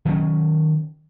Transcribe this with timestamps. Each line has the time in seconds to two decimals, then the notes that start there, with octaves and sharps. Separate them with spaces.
0.05 D#3 F#3 A#3 C#4